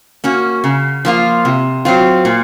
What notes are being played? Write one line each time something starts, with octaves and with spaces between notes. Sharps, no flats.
A#3 C#4 F#4
C#3
F3 A#3 F4
C3
F#3 C4 F4
A#2